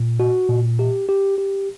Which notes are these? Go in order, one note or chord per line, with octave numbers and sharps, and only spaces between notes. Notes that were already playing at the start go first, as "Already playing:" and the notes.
Already playing: A#2
F#4
A#2
G4
G4
G4